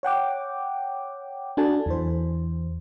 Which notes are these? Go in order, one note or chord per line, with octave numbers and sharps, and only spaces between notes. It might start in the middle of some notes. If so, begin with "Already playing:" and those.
C#5 F#5 G5 D6
D4 F#4 A4 G#5 A5
E2 E3 C5